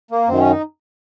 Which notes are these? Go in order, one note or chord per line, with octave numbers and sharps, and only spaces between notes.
A#3
F#2 D#3 C4
C#4
D#4